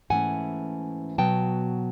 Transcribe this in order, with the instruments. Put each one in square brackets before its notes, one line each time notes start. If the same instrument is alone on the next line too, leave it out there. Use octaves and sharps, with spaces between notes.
[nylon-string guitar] G#2 E3 A3 C#4 F#5 G#5
B2 F#3 B3 G5 A5